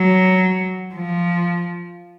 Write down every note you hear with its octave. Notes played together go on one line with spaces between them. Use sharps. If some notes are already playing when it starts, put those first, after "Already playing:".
Already playing: F#3
F3